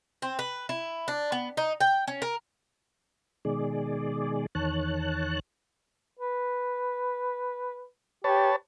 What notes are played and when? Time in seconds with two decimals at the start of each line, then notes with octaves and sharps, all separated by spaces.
0.22 C4
0.39 B4
0.69 E4
1.08 D4
1.32 B3
1.57 D#4
1.81 G5
2.08 C#4
2.22 A#4
3.45 B2 D#3 G#3 G#4 D5
4.55 E2 D#3 C#5 A5 F#6
6.19 B4
8.24 G4 B4 C#5 A5